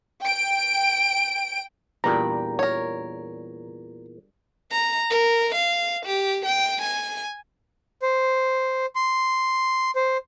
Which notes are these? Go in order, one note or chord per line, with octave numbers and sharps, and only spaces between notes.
G5 D7
E2 A#2 G3 D4 G4 A#5
A#4 C#5
A#5
A#4
F5
G4
G5
G#5
C5
C6
C5